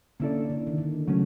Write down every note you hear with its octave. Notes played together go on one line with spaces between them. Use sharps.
D3 A#3 C#4 E4 A4 D5
D3
D#3
D3
C#3 F#3 A3 C#4